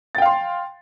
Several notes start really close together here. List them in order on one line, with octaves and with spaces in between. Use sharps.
A6 G5 F5 C6